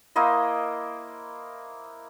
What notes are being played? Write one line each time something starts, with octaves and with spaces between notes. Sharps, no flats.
A#3 E4 C5 D#5